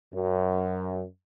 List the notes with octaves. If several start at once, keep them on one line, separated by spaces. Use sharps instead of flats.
F#2